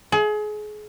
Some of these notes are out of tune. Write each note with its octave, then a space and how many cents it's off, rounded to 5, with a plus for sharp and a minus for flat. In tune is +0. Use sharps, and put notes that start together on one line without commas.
G#4 +30